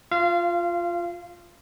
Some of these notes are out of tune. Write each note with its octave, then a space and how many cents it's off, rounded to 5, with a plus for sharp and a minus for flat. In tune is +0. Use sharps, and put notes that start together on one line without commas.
F4 +0 F5 -25